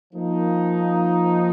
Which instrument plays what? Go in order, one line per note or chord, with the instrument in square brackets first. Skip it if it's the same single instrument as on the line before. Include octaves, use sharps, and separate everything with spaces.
[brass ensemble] F3 A#3 D#4